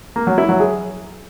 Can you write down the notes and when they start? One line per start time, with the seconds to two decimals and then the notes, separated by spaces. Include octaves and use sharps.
0.16 A#3
0.27 F#3
0.38 E4
0.49 F#3
0.60 G#4